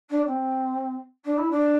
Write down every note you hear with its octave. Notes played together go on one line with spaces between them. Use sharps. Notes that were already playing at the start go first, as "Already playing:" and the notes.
D4
C4
D4
E4
D4